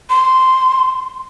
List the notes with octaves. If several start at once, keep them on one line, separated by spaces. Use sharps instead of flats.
C6